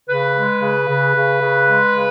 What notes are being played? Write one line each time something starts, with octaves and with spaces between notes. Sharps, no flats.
C#3 B4
G#3
C#3
C#3
C#3
C#3
G#3
C#3